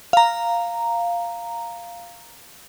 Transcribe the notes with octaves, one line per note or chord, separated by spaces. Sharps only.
F5 A#5